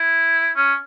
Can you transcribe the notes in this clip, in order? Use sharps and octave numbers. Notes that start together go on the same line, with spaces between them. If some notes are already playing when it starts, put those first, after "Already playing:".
Already playing: E4
C#4